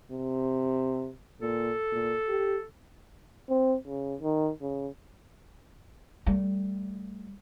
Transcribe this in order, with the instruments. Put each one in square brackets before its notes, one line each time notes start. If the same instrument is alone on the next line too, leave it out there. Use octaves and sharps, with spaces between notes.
[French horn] C3
[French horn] A#2 [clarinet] A4
[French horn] A#2
G4
[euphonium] C4
C#3
D#3
C#3
[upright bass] G3 A3